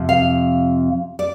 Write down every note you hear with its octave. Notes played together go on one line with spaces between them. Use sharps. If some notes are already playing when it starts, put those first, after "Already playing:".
Already playing: F2 C3 F3
F5
D5